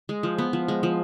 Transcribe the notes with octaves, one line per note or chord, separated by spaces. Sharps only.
G#3
F3
B3
F3
G#3
F3